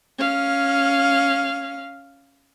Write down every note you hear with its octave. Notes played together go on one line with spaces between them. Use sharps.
C#4 F5